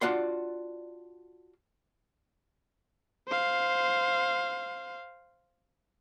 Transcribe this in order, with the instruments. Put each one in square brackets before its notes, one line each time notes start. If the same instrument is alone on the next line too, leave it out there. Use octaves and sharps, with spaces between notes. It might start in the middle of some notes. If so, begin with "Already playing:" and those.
[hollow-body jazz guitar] D4 F4 F#4 D5 F#5 C6
[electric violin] C5 F5